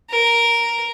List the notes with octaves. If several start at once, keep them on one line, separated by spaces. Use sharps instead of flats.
A#4